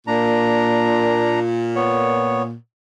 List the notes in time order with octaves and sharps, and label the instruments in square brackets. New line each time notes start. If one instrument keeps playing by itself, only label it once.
[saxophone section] A#2 [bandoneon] D4 A#5
[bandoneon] B3 C#5